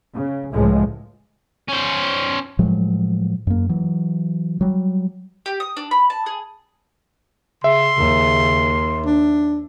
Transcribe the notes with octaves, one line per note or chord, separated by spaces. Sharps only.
C#3
C#2 A2 F3 G#3
C#4 C5
A2 F3 F#3 G#3
F#2 A#3
E3 F#3
F#3 G3
G4
D#6
D4
B5
A5
G#4
C#3 E5 C6
D#2 C#3
D4